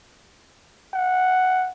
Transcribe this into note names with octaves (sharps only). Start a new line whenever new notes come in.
F#5